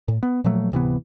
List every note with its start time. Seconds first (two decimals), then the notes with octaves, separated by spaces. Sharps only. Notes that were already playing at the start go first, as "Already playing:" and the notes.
0.08 A2
0.23 B3
0.44 A#2 F3 F#3 A3
0.72 D1 C3 E3 B3